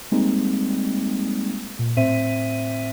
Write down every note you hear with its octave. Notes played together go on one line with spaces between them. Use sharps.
G3 G#3 A#3 C4 D#4
A#2
A2 C4 C5 E5 B6 D#7